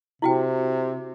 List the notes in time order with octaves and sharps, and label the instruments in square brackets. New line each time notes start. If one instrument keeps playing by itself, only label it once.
[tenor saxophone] C3 [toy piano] E4 F#4 G5